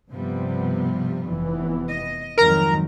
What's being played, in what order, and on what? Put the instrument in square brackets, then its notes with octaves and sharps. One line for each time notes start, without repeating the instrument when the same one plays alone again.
[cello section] G2 F3 G3 [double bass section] C3 B3
[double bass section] F1 E3 B3
[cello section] D#5
[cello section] F2 G#2 F3 [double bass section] D#3 F#3 [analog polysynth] A#4 A#5